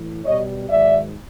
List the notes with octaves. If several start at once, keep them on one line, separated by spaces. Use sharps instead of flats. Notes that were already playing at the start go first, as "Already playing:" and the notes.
Already playing: A2 E3
B2 G3 C#5 D#5
G#2 D#3 F#3 D5 E5